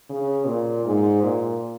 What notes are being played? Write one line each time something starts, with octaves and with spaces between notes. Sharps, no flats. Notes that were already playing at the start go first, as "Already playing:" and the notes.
C#3
A#2
G#2
A#2